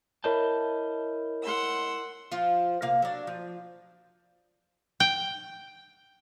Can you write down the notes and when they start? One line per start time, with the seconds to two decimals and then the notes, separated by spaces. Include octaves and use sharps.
0.24 E4 A#4 C#5 D#5 E5 A5 B5 G6
1.42 F#5 C6 E6
2.32 F3 F4
2.82 C3 A#3 F5
3.02 F#3 D4
3.27 F3
5.00 G5